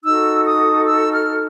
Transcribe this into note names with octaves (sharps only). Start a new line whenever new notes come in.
D#4 F#4 A4 E6
D#6
E6
F6